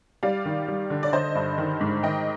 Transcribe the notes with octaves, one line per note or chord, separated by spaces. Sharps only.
G3 D5 F5
D#3
G3
D3
D5
D3 C5 D#5
G2
D#3
G#2
D#3 D#5 G5